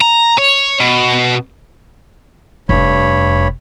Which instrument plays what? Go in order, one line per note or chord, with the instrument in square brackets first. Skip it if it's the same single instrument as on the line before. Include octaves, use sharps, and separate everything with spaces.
[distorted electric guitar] A#5
C#5
B2
[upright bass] F1 [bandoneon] G2 C#5 B5